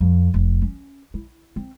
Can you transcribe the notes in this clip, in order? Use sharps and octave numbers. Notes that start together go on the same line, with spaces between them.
F2
F1
C#4
E4
C4